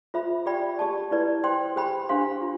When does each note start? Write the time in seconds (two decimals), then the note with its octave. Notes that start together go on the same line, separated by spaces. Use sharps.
0.14 F4 C5 E5 B5
0.46 G4 D5 G5 B5
0.79 G4 D5 A5
1.11 E4 B4 D5
1.44 C5 G5 C6
1.76 G4 C5 G5 B5
2.09 D4 G4 C5 F5 C6
2.42 F4